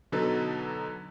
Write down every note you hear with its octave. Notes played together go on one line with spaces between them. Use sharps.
B2 D3 F#3 D#4 A4 B4